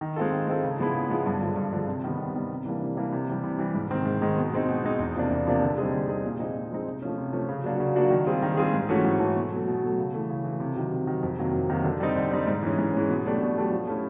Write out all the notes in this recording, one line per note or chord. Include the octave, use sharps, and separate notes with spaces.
D#3
G#3 C4 F4 A4
D#3
G#3 C4 F4 A4
C#3
F3 G#3 B3 E4
C#3
F3 G#3 B3 E4
G2
D3 F3 G#3
G2
D3 F3 G#3
C3
D#3 G3 B3
C3
D#3 G3 B3
C3
E3 G3 A#3 D4
C3
E3 G3 A#3 D4
C3
E3 G3
C3
E3 G3
G#2
D#3 G#3 C4
G#2
D#3 G#3 C4
B2
G#3 C4 D#4
B2
G#3 C4 D#4
E2
C3 F3 A#3 D4
E2
C3 F3 A#3 D4
D3
G3 C4 D#4 G#4
D3
G3 C4 D#4 G#4
A#2
F3 G#3 C4 D#4
A#2
F3 G#3 C4 D#4
C3
F3 A3 C#4
C3
F3 A3 C#4
C#3
F#3 A#3 D4 F#4
C#3
F#3 A#3 D4 F#4
D#3
G3 C4 F4 G#4
D#3
G3 C4 F4 G#4
G#2
E3 A3 C#4 F#4
G#2
E3 A3 C#4 F#4
B2
F#3 A3
B2
F#3 A3
C#3
E3 A3
C#3
E3 A3
C3
D#3 F#3
C3
D#3 F#3
F2
C3 D#3 F#3 A#3
F2
C3 D#3 F#3 A#3
D3
G3 C4 D#4
D3
G3 C4 D#4
G#2
E3 G#3 C#4
G#2
E3 G#3 C#4
B2
F#3 A3 D4 G4
B2
F#3 A3 D4 G4
F3
A3 C#4 E4